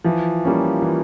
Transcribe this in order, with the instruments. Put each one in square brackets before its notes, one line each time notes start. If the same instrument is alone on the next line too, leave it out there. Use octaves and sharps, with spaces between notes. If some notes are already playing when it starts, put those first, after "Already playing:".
[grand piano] E3 [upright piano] F3
[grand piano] G3 A#3 C#4 F4
E3